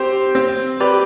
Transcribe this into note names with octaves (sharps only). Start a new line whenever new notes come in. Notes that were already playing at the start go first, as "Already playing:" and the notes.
Already playing: C4 G4 C5
C4
G4 B4 D5